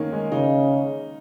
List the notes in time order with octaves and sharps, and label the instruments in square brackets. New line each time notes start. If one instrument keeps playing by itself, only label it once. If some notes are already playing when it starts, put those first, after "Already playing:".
Already playing: [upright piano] D#3 A#3 C#4
G#3
[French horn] C#3 [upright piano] D#4